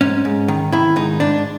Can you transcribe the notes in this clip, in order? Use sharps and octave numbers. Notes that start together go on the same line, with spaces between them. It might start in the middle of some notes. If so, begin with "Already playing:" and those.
G#2 C#4
G#2
D#3
D#3 E4
G#2 D#4
G#2 D4